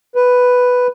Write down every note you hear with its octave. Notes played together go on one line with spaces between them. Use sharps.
B4